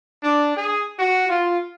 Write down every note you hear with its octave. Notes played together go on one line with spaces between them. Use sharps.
D4
G#4
F#4
F4